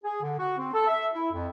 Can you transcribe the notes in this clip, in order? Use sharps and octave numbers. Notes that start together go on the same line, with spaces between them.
G#4
D3
F#4
C4
A4
E5
E4
F2